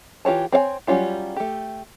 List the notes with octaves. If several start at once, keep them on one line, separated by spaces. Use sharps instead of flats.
E3 F4 G4 C#5 A5
C4 C#5 F5 G#5
F#3 G3 C#4 F4 G4
A3 G4